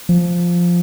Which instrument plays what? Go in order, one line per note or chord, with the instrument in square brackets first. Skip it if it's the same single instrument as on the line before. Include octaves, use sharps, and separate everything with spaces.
[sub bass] F3